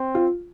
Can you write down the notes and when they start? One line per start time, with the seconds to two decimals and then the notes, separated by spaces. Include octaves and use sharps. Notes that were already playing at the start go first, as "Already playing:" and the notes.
Already playing: C4
0.15 F4